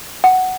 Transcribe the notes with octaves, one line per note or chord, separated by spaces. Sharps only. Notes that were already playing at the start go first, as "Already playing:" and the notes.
F#5